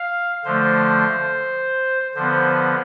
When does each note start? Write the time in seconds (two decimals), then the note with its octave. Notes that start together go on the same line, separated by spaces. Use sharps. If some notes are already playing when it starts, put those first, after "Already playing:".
Already playing: F5
0.45 D3 F3 A3 C5
2.15 D3 F3 B3 C5